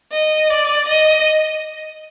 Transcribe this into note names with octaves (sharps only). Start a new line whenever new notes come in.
D#5
D5
D#5